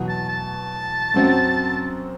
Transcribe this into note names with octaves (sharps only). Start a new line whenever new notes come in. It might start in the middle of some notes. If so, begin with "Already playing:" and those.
Already playing: E2 B2 F#3
A5
A5
F#2 F#3 C4 F#4